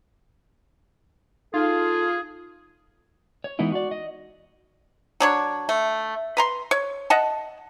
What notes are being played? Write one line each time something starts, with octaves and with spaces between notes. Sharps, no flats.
D#4 F4 G#4 A4 F5
C#5
E3 G#3 B3 D#4 E4
F#4 D5
D#5
F#3 D4 C#5
A3
B4 A#5 C6
C#5
D#5 F#5 A5